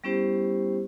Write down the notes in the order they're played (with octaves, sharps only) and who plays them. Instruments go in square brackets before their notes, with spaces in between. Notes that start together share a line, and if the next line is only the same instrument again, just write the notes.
[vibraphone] G3 B3 C#4 E4 G4 C5